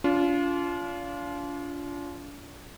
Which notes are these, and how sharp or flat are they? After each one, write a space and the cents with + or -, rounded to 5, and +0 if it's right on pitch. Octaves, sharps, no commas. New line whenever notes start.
D4 -40 F4 -5